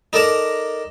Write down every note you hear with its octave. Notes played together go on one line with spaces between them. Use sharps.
D#4 A4 A#4 D5 A5